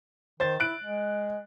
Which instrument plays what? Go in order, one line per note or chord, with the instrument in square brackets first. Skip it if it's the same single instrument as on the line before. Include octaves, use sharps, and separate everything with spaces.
[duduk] D#3 [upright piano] C5 A6
[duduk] E4 [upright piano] F#6 D7
[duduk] G#3